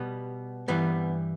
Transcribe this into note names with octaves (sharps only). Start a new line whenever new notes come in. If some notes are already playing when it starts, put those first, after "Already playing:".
Already playing: B2 G3 B3
G2 E3 G3 B3